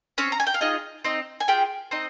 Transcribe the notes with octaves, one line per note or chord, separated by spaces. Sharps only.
C4 C#4 C#5
A#5
G#5
G5
F5
D#4 F4 G#4 D#5
C4 D#4 D#5
G#5
F4 G4 G#4 G5
C4 D#4 D#5